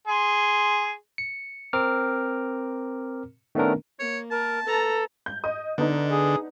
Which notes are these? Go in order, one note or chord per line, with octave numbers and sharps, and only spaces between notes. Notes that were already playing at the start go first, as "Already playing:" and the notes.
G#4 C6
C#7
C4 A#4 D6 F6
D#3 A3 B3 C#4 D4 A#4
A#3 C#5
A#4 A5
A4 B4 A#5
G6
D#5 D#6
D3 B3 D4 D#4
G#4